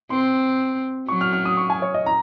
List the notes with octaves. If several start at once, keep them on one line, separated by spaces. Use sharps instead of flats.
C4 C6
F#3 C#6
F6
F6
D#6
C#6
G#5
C#5
D#5
A#5